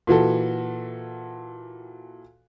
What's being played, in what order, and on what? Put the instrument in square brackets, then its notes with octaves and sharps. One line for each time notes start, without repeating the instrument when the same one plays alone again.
[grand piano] A#2 E3 F#4 A4